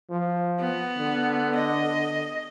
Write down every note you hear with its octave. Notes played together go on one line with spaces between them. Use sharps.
F3
B3
D3
D#5